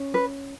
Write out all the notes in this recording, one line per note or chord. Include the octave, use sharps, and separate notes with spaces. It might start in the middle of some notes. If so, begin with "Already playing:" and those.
Already playing: C#4
B4